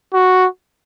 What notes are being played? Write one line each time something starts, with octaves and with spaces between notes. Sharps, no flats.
F#4